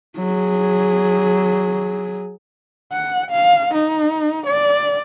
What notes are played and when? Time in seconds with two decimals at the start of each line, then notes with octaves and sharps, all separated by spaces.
0.18 F#3 G#4
2.93 F#5
3.31 F5
3.74 D#4
4.46 D5